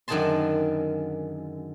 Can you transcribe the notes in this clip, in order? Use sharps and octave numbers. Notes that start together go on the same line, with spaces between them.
F#2 D3 D#3 G#4 A5 C6